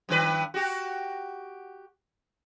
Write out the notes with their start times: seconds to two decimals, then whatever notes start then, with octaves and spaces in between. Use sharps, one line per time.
0.09 G2 D#3 B4
0.54 F#4 G4